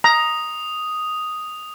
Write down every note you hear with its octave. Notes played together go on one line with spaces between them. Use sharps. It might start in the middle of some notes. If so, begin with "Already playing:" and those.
A#5 D#6